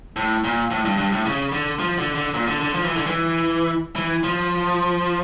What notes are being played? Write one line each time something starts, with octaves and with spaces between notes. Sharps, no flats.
A2
A#2
A2
G2
G2
A2
C#3
D3
F3
D3
D3
A#2
D3
D3
F3
E3
D3
E3
E3
F3